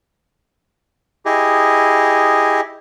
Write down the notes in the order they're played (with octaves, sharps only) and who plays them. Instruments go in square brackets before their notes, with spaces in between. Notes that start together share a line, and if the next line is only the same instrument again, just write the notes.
[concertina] E4 G4 G#4 D#5